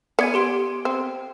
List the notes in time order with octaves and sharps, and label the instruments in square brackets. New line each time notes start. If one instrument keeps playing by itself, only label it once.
[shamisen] B3 D5 [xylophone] G#5 G#6 C#7
[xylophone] G4 C6 D7
[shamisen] C4